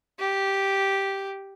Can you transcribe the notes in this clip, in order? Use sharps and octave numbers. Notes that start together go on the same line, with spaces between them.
G4